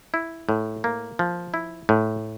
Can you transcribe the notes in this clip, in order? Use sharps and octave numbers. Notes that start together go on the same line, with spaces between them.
E4
A2
A#3
F3
E4
A2